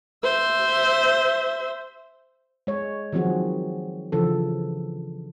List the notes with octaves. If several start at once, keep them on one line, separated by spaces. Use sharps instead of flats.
C5 E5
G#3 C#5
D#3 F3 F#3 C4 F#4 G#4
C#3 E3 F3 D4 A4